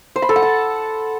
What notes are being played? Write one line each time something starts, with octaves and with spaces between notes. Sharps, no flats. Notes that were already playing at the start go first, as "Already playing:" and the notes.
C5
B5
A4
F#5
A5